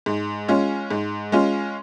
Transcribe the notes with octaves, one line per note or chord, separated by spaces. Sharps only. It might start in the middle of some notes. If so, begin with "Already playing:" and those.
G#2
G#3 C#4 F4
G#2
G#3 C#4 F4